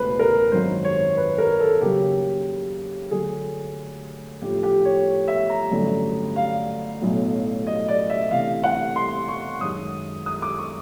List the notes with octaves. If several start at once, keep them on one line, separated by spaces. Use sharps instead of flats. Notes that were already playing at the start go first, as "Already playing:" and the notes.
Already playing: E1 D2 C#3 E3 B4 C5
A#4
G#1 F#2 D#3 F#3 C5
C#5
B4
A#4
A4
D#2 C#3 F#3 A#3 G4
D2 D3 F#3 A3 G#4
A1 A2 F3 G4
G4
C#5
E5
A#5
A1 G2 D3 F#3 A3
F5
B1 A2 F#3
D#5
D5
E5
D2 C3 E3 F5
F#5
C6
C#6
F#2 D#3 G#3 D#6
D#6
D6
C#6